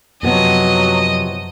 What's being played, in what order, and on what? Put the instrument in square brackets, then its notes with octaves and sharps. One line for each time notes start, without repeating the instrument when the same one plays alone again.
[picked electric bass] F#2 [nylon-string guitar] C3 F3 B3 [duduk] F#3 [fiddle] D#5